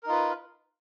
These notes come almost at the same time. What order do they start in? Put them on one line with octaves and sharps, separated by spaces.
A#4 D#4 F4 B4